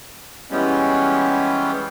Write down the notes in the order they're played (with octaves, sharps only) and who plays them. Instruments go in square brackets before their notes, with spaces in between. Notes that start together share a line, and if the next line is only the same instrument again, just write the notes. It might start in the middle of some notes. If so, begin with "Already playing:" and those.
[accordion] E3 G3 G#3 B3 C#4